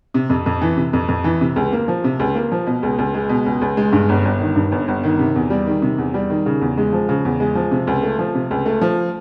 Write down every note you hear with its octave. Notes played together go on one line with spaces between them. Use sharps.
C3
F2
F2
E3
C3
F2
F2
E3
C3
C#2
A#3
F3
C3
C#2
A#3
F3
B2
C#2
C#2
G#3
B2
C#2
C#2
G#3
G2
G1
G1
D#3
G2
G1
G1
D#3
C3
E2
G3
D#3
C3
E2
G3
D#3
C#3
E2
G#3
F3
C#3
E2
G#3
F3
C3
C#2
A3
F3
C3
C#2
A3
F3